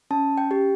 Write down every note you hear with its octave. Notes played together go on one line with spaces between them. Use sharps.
C#4 A5
G5
G4